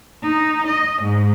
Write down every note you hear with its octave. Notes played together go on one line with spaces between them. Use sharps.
D#4
D#5
G#2